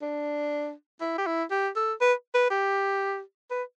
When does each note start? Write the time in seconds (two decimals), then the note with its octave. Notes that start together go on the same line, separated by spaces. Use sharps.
0.02 D4
1.01 E4
1.18 G4
1.26 E4
1.51 G4
1.76 A4
2.01 B4
2.35 B4
2.50 G4
3.51 B4